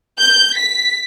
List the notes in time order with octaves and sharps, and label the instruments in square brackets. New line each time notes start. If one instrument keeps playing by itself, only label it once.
[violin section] G6
B6